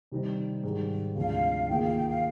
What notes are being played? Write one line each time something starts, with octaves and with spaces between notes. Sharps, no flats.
C3 D#3 G3 C4 D#4
G#2 D#3 G3
D2 C3 F3 G#3 D4 F5
D#2 D#3 A#3 F4 G#4 G5
F5
G5
F5